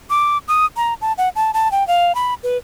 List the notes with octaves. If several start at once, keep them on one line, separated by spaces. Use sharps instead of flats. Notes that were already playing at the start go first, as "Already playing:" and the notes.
D6
D#6
A#5
A5
F#5
A5
A5
G5
F5
B5
B4